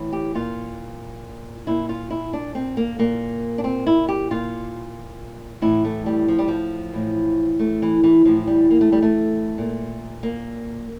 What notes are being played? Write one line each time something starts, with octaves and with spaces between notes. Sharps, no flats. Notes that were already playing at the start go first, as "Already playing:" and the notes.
Already playing: A2 E3
G4
A#2 F4
A#2 E4
F4
E4
D4
C4
A#3
A#2 A#3
D4
C4
E4
G4
A#2 F4
A2 E3 E4
A3
G3
F3
G3
F3
A2 E3
A3
E3
E3
A2 E3 F3
G3
A#3
A3
G3
A3
A#2
A#3